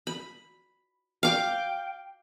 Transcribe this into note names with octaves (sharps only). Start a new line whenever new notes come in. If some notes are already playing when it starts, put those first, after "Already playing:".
B5
F5 G5 D6